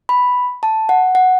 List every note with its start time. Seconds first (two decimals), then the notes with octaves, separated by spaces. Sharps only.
0.09 B5
0.63 A5
0.89 F#5
1.15 F#5